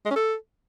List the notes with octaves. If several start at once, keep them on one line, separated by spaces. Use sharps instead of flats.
G#3
C#4
A4